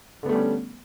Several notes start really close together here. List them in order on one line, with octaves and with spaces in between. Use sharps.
D3 B3 A3 G3 C#4